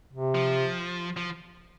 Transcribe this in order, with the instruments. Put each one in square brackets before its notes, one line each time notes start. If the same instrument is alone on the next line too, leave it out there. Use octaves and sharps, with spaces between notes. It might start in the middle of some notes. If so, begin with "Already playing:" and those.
[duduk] C3
[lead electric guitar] F3
F3